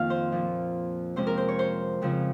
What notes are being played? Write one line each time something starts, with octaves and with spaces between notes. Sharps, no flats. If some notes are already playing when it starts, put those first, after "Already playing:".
Already playing: F2 D#3 A#3 F4 F5
C5
A#2 F3 A#3
C3 F3 G#3 C#4 C5
A#4
C5
C#5
C5
F2 C#3 F3 C4